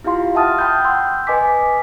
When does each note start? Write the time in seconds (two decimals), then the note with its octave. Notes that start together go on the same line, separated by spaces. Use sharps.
0.04 E4 F4 G4 F5 C6
0.35 E5 F#5 A5 D#6 F6 A6
0.59 G5 B5 C6 D#6 F6 G6
0.84 F#5 C6 E6 G6
1.27 B4 D#5 G#5 D6 B6